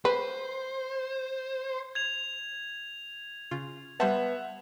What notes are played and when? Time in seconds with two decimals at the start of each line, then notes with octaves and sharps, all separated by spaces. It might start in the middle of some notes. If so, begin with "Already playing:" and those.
0.05 B4 C5
1.95 G#6 F7
3.51 C#3 F4
4.00 G3 B3 C5 E5 F#5 A5